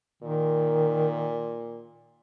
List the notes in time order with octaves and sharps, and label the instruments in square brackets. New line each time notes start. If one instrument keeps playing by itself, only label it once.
[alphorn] A#2 [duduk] D#3